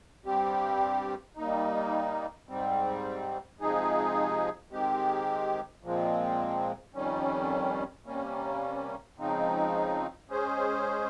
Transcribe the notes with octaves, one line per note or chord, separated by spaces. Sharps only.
G2 G3 C4 G4
G3 A#3 D#4
G#2 G3 C4
C3 F3 G#3 D#4 G#4
D#3 G#3 C4 G4
A#2 F3 G#3 C4
F2 D#3 G3 C#4
C3 G3 A#3 C#4
C#3 F3 G#3 C4 D#4
G#3 C#4 G#4 C5